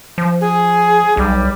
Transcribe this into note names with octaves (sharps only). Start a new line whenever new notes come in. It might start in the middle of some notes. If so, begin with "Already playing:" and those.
F3
G#4
B1 G3